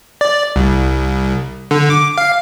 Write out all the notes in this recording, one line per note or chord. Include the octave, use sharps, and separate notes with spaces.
D5
C2
D3
D6
F5